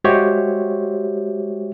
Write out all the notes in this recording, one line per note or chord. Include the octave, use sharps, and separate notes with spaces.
G#3 F#4 G4 C5 C#5 E5